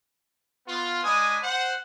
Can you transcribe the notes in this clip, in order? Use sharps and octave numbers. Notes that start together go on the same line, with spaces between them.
B3 F4
G#3 D4 G#5 B5 D#6
C5 F#5